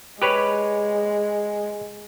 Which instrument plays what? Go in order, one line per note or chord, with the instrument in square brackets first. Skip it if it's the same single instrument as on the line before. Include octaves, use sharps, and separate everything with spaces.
[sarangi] G#3 [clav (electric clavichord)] G4 B4 C#5